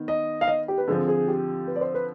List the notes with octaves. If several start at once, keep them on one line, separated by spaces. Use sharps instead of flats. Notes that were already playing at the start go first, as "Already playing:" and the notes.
Already playing: D#3 B3
D#5
F5
D#5
G4
B4
D3 F3 C4 G#4
G#4
G4
B4
D5
C5
B4